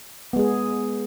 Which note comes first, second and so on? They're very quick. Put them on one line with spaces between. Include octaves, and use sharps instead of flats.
B3 G#3 G#4